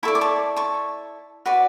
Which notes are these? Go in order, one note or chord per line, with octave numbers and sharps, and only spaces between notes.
E4 A4 D5 A5 C#6
D6
A5 C#6
A5 C#6
F#4 B4 D5